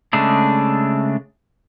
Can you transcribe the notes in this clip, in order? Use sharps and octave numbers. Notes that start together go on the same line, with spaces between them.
C#3 G#3 A3 D4